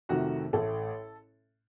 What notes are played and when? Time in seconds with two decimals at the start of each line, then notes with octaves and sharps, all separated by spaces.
0.09 F2 C3 D#3 A3 F#4
0.53 A1 A2 A3 A4